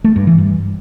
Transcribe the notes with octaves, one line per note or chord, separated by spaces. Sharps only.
A3
G2
E3
G2